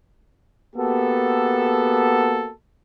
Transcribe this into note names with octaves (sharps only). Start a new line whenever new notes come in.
A#3 B3 F#4 G4 A4